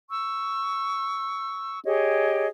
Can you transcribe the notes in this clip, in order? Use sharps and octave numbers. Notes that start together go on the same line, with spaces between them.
C#6 E6
G4 G#4 C#5 D#5